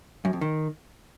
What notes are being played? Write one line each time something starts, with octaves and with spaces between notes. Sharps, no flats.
F#2
F2
D#3